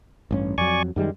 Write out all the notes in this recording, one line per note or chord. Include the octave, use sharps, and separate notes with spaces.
A1 G2 C#4
F2 F#3 D5 G#5 C#6
F#2 D#3 G3 G#3